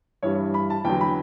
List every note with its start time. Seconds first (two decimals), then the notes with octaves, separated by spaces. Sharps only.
0.23 G2 E3 G3 C#5
0.54 B5
0.70 A5
0.85 E2 D3 F#3 G5
1.01 B5